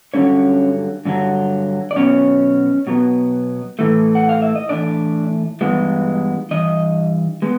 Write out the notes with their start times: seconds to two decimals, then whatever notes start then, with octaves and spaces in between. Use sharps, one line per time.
0.14 G2 D3 F#3 C#4 C#5
1.05 G2 D3 F#3
1.91 D5
1.96 B2 F#3 B3 C#4 C#5
2.87 B2 F#3 B3
3.79 A2 E3 A3
4.15 F#5
4.29 F5
4.42 E5
4.55 D#5
4.69 A2 E3 A3 D4 D5
5.61 G2 E3 G#3 B3
6.51 G2 E3 D#5
7.42 G#3 B3